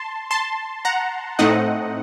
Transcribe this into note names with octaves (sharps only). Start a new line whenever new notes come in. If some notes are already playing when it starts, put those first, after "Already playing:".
Already playing: A5 C6
A5 C6
F#5 A#5
A2 A3 C4 D#4 D#5 F#5